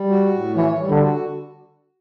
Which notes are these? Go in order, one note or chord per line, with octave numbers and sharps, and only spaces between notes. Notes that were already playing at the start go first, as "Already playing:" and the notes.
Already playing: G3
F#4
A2
E3 C#5
G3
D3
F#4